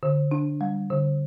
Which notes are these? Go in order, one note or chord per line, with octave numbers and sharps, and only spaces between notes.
D3
D4
G3
D3